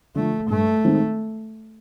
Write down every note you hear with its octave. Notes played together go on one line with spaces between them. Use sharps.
D3 F3 A3
G2 A3
D#3 G#3 C4 D#4